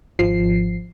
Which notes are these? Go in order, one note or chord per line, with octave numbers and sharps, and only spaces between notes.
G#1 F3 C7